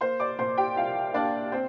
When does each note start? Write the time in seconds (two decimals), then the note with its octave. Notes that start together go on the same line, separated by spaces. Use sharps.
0.01 A#3 C5 C6
0.20 D5 D6
0.39 A#2 C5 C6
0.58 G4 G5
0.76 C2 F4 F5
1.14 A#3 D4 D5
1.52 C4 C5